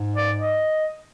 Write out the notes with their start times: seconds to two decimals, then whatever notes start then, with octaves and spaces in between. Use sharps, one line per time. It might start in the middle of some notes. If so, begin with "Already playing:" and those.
Already playing: G#2
0.16 D5
0.38 D#5